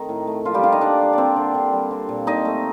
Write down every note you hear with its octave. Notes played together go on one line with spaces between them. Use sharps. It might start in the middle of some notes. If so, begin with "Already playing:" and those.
Already playing: D#3 A3 C4 D#4
A2
A3
F3 A#3 F4
G3 G4
D3 F4 F5
D#4 D#5
D3 D4 D5
G3
A#3 C4 C5 D5
D3
D3
G3
C4
A#2
A#2 D#4 D#5
A3